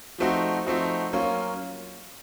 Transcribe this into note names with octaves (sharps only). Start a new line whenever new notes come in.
F3 A3 C4 D#4 F#4
F3 A3 C4 D#4 F#4
F#3 A#3 C#4 F4